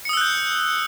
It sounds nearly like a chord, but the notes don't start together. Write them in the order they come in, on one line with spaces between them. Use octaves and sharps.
C#7 D#6 E6 F#6 G6